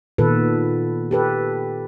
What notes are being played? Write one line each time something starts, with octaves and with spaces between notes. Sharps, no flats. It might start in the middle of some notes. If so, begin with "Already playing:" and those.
A#2 D#3 B3 A4 B4
G4 A4 B4